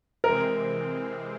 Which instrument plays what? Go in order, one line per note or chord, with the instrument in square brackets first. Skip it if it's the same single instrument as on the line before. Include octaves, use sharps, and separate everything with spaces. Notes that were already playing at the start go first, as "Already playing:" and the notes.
[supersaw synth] C3 E3 G#3 C4 [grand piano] A#4